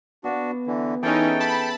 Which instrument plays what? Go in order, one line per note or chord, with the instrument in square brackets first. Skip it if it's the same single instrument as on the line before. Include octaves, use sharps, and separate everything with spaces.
[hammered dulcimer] B3 F5 [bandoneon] D4 F#4
[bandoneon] D3 E3
[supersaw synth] E3 C#4 D#4 [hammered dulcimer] G#4 B4 E5 [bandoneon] A4 G5
[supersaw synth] A5 B5